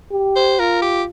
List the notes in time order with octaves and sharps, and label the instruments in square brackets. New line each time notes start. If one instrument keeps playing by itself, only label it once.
[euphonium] G4
[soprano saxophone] C5
[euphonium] F4 [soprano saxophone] A#4
[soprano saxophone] G4